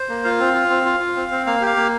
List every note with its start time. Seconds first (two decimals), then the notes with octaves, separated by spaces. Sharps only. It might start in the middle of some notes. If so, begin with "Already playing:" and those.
Already playing: C5
0.09 A#3
0.24 F4 F5
0.40 C4
0.54 F4
0.70 C4
0.85 F4
1.00 F4
1.16 C4
1.31 C4
1.46 A#3 F5
1.62 G4 F5
1.76 A#3